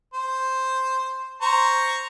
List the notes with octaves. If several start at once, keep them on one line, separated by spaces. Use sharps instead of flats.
C5
C5 A#5 C#6